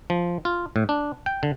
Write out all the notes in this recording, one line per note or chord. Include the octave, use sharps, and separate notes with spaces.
F3
F4
A2
D4
G5
D3